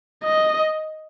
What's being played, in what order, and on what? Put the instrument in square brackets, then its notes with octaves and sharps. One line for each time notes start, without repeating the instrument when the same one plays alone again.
[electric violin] D#5